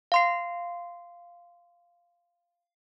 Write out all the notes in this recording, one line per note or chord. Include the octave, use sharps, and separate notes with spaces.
F5 C6 C7